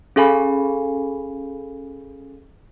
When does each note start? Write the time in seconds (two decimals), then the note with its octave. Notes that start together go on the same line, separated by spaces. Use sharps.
0.16 C#4 G#4 A4 F5 G#5 B5